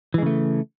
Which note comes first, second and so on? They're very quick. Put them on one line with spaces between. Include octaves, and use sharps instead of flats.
E3 G#3 C#3 A3